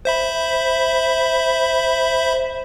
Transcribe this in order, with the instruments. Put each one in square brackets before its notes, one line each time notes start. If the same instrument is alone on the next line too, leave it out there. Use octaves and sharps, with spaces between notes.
[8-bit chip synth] C5 E5 B5